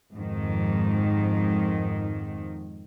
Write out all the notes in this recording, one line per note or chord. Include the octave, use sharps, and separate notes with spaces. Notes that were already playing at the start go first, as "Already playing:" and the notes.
F2 G#2 D#3